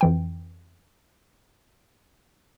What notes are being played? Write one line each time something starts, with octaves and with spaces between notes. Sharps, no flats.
F2 E3 G5